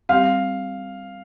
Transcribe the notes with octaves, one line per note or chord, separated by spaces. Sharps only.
G3 C4 G4 F5